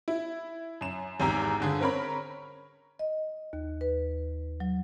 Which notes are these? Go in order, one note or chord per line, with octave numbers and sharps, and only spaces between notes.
E4
F#2 E7
G#1 E2 G4 A#5 E6
G1 D3 G#4
C4 C#4 A#4 C#5 B5
D#5
D#2
B4
F#3